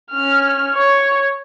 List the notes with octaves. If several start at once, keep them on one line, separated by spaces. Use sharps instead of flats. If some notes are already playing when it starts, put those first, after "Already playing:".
C#4 F6
C#5